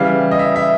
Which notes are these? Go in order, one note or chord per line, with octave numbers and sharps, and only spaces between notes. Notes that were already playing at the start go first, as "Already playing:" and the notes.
Already playing: C#3 E3 G3 F5
D#5
E5
E5